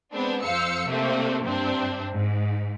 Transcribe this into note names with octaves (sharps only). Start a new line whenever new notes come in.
G#3 B3 C4 D4
F2 C5 F5 E6 C#7
C3 A3 A#3 C4 D4
G2 C3 C4 D4
G#2